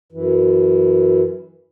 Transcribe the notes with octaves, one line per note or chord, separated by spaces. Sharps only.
F#2 E3